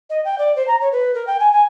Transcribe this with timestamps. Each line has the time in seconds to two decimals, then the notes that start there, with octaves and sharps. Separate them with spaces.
0.10 D#5
0.25 G5
0.38 D5
0.56 C5
0.67 A#5
0.81 C#5
0.92 B4
1.15 A#4
1.27 G5
1.40 G#5
1.52 G#5